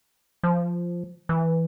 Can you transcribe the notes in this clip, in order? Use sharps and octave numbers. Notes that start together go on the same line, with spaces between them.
F3
E3